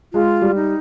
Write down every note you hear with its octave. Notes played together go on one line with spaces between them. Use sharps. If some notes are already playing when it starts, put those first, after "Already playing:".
G#3 F4
G3
D#4